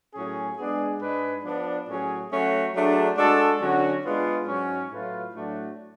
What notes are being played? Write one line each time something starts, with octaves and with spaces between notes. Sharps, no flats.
A2 F#3 C#4 G#4
G#3 B3 D4 G#4
G#2 G#3 D4 G#4 B4
F3 B3 D4
A2 F#3 C#4 G#4
F#3 A3 C#4 F#4
F#3 A3 D4 G#4
G#3 D4 F#4 A4
D3 F#3 C#4 F#4
G#3 B3 D4 F4
G#2 F#3 C#4
A2 F#3 A3 F4 B4
A2 F#3 A3 D4 F#4